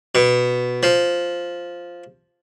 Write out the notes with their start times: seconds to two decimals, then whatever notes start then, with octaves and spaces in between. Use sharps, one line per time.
0.15 B2
0.83 F3